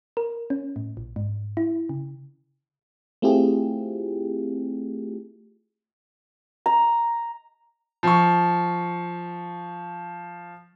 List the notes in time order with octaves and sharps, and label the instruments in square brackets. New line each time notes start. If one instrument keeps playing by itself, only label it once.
[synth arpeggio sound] A#4
C#4
A2
A#1
G#2
E4
C#3
[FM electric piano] A3 C4 E4 F4 G4 G#4
[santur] A#5
[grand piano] F3 C#6